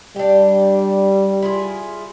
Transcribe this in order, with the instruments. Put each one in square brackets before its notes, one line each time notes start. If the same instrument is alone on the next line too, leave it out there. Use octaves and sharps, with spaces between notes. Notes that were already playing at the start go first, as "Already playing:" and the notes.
[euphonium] G3 [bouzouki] D4 G4
[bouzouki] E4 F4 G#4